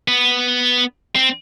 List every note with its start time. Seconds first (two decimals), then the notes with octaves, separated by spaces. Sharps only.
0.08 B3
1.15 C4